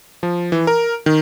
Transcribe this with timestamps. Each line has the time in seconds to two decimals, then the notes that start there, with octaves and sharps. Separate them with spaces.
0.23 F3
0.52 E3
0.67 A#4
1.06 D#3